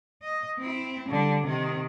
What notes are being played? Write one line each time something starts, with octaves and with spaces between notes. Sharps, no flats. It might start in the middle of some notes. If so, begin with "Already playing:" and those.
D#5
C4 E4
D3 G3
C3 D#3